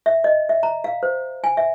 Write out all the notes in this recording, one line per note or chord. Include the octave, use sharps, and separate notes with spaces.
E5
D#5
E5
A#5
F5
C5
G#5
E5